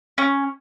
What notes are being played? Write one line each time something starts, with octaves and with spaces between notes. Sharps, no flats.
C#4